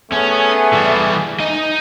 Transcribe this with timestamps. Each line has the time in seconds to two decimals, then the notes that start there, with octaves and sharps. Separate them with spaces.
0.12 A3 B3 C#4 G#4
0.73 E3 G3
1.40 D#4 D#5